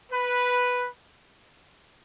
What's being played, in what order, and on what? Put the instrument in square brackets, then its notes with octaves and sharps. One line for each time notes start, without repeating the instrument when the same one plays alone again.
[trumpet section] B4